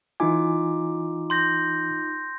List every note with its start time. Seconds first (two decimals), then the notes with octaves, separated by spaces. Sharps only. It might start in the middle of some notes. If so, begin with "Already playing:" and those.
0.20 E3 D#4 F4 G#5 D6
1.30 C6 G6 A#6